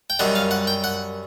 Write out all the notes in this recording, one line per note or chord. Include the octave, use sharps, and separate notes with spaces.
G5
F#2 D#3 G3 F#5
F5
F#5
G5
F#5